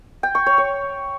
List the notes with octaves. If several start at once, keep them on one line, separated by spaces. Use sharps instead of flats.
G5
C#6
C#5
C#5